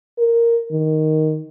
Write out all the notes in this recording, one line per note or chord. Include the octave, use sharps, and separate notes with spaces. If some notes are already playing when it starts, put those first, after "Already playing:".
A#4
D#3